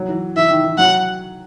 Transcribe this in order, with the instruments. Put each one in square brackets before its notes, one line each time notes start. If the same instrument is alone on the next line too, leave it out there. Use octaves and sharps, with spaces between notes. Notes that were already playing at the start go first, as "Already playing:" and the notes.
Already playing: [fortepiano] F#3
E3
[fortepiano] E3 [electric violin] E5
[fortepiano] D#3
E3
[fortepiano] F#3 [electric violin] F#5